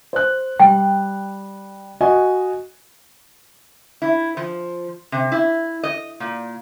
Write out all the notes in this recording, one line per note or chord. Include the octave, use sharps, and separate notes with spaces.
C5 F#6
G3 G5
F#4 D#5 G#5
E4
F3
C3
E4
D#5
A#2